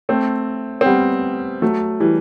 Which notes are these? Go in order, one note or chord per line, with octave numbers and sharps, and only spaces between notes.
A3 C4
C4
G3 B3
F#3 A3
E3 G3